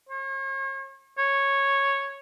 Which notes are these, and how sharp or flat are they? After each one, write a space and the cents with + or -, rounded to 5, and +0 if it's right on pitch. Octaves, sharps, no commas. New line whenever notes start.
C#5 -40
C#5 -5